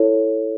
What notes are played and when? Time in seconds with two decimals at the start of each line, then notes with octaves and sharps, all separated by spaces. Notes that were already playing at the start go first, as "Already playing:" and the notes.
Already playing: E4 A4 C#5